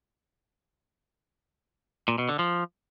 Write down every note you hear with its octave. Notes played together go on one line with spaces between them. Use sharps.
A#2
B2
D3
F3